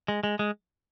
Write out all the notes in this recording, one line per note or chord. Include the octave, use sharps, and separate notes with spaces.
G#3
G#3
G#3